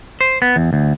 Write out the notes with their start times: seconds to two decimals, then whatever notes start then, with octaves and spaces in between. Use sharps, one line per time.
0.21 C5
0.42 B3
0.56 E2
0.73 D2